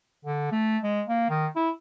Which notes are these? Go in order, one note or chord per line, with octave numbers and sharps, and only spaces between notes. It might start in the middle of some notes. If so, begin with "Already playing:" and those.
D3
A3
G#3
A#3
D#3
E4